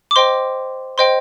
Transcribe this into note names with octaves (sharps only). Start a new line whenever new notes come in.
D6
C5 D#5 G5 C6
C5 D#5 G5 C6